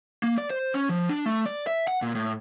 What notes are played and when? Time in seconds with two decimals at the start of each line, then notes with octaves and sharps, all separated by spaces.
0.23 A#3
0.38 D5
0.50 C5
0.74 C#4
0.89 F3
1.09 D4
1.26 A3
1.46 D5
1.67 E5
1.88 F#5
2.02 A#2
2.15 A2